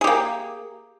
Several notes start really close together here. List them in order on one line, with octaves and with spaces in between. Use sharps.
G#4 G4 A#3